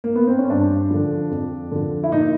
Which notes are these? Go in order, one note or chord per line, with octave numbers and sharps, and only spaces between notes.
A#3
B3
C4
C#4
G2 D4
D3 F3
F2
D3 F3
E4
A#2 D#4